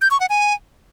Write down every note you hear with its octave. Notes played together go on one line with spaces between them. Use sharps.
G6
C#6
F#5
G#5